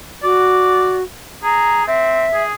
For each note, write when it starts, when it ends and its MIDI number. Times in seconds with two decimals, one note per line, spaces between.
0.24 1.03 66
0.24 0.96 74
1.43 1.85 68
1.43 1.84 82
1.87 2.25 60
1.87 2.43 76
2.34 2.54 68